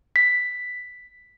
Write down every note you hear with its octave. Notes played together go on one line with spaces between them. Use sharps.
B6